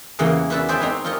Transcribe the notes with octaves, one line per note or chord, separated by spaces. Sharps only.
E2 C#3 E3 A#3 G#4 F#5
B3 C#4 F#4 B4 D5 E5
G#4 C5 D5 E5 G5 G#5
C4 D#4 B4
F4 G4 A#4 C#5 D#5